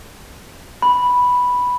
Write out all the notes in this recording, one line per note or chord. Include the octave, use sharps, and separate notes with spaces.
B5